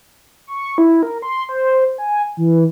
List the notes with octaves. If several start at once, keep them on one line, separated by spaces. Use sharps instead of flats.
C#6
E4
A#4
C6
C5
G#5
E3